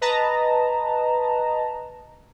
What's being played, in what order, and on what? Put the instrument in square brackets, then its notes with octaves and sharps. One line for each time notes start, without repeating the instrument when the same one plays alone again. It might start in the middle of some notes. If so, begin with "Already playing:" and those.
[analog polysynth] B4 D#5 A5 A#5